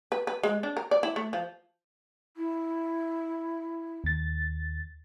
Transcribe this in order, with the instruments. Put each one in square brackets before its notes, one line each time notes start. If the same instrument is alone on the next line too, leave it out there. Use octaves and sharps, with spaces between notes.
[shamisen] B4
B4
G#3
D4
A#4
D5
E4
A3
F3
[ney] E4
[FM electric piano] D#2 A6